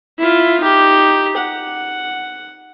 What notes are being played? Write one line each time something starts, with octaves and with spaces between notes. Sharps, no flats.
E4 F4
D#4 G4
F#5